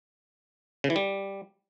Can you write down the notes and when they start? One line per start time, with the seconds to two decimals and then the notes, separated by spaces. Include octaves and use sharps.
0.84 C#3
0.90 E3
0.96 G3